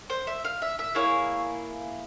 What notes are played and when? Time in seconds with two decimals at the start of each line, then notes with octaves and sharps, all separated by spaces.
0.10 C5
0.27 E5
0.45 F5
0.62 E5
0.79 E5
0.95 A#3 E4 G#4 C#5